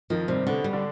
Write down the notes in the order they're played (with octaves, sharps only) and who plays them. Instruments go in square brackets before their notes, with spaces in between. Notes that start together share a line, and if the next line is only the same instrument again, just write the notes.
[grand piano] F2 F3 [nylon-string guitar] D#3
[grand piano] G2 G3 [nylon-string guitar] C3
[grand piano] B2 B3 [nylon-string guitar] D3
[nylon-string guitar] G3
[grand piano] D3 D4